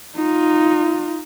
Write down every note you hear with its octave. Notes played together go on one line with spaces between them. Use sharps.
D#4 F4